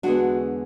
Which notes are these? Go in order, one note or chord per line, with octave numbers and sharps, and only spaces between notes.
E2 D3 G#3 B3 D4 F#4